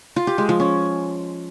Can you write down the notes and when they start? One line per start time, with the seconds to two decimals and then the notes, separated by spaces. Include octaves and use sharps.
0.16 F4
0.27 G4
0.38 G#3
0.49 F3
0.60 C#4